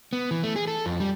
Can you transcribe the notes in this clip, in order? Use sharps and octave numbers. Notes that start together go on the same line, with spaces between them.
B3
E3
A3
G#4
A4
F2
G3